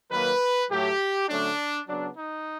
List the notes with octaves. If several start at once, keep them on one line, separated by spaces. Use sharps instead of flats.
D#3 F#3 A#3 B4
A2 F#3 A3 G4
D3 F#3 A3 C#4 D4
C#3 F#3 B3 D4
D#4